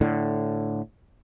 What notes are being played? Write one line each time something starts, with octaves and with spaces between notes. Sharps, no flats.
A2 D3